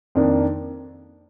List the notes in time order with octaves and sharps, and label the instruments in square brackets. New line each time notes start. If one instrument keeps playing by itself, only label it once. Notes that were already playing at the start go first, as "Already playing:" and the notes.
[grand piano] F2 D#3 A#3 D4